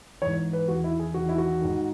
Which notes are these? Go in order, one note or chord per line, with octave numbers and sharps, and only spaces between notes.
G#2 E3 C#5
B4
E2 D#3 F#4
E4
G#4
E2 D#3 F#4
E4
F#4
G#2 D#3